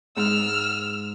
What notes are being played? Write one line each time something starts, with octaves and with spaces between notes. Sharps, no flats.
G#2 E6 F6